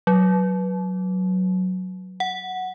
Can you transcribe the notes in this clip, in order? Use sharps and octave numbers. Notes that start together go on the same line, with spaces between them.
F#3
F#5